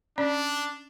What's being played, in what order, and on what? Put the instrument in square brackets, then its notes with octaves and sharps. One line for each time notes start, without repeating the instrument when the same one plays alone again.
[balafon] C#4 D5 [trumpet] D4